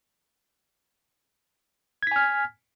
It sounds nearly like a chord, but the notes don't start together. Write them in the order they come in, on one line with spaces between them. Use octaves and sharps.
G#6 B6 G#5 F6